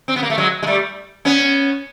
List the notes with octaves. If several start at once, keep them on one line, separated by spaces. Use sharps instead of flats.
C4
B3
A#3
A3
F#3 G#3
G#3
G3 A3
B3 C#4